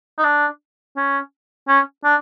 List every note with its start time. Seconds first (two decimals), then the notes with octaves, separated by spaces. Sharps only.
0.18 D#4
0.24 D4
0.97 C#4
1.68 C#4
2.04 D4